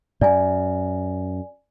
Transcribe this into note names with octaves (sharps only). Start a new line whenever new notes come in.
F#2 D5 G#5